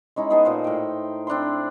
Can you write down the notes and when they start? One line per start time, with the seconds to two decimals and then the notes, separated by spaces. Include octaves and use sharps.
0.16 G#3 C#4 D#4 E4
0.30 B3 D#4 G#4 A4
0.45 A#2 C5
0.64 A2 G5
1.27 C4 D4 E4 C6